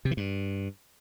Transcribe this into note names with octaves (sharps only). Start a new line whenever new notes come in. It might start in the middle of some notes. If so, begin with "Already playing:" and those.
C3
E3
G2